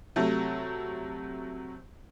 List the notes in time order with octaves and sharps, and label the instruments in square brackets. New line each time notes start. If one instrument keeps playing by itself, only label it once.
[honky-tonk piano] C3 F#3 A3